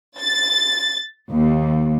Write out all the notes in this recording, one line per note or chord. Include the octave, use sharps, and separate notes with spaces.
A6
D#2